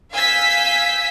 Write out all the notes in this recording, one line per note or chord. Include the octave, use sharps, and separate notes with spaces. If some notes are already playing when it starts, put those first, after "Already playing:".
F5 G#5 E6 G6 B6